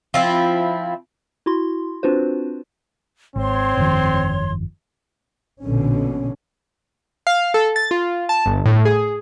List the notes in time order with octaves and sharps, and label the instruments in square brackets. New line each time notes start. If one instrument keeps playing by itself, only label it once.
[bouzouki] F3 C4 E4
[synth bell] E4 F#4 C6
C4 D4 F4 F#4 B4 C5
[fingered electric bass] G#1 [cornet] C4 [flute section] C#5 C6
[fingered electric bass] G1 F2 D#3
[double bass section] A#1 B2 D3 C#4
[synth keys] F5
A4
A6
F4
A5
G1
A2
G#4